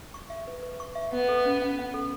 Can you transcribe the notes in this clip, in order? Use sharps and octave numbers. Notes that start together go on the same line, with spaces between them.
C#6
E5
B4
B4
C#6
E5
B3 F#5
A4
C#4
C#4
F#5
A4